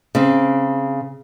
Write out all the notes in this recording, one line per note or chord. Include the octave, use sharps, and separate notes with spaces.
C#3 C4